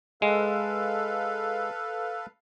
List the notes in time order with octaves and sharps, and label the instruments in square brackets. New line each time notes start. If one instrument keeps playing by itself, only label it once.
[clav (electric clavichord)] G#3 [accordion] A4 B4 F5